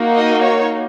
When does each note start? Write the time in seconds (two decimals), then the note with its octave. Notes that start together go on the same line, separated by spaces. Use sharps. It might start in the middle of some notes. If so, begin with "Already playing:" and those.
Already playing: A#3 D#4 F#4
0.15 D#5
0.42 C#5